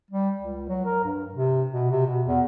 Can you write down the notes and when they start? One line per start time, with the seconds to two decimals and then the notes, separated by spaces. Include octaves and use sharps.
0.11 G3
0.38 C#2
0.69 F#3
0.85 A#4
1.04 G2
1.35 C3
1.70 B2
1.91 C3
2.07 B2
2.26 E2